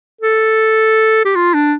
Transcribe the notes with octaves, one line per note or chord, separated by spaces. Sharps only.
A4
G4
F4
D4